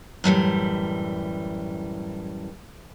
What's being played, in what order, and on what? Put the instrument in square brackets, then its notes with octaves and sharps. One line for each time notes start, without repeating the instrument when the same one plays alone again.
[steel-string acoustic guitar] F#2 A2 E3 G3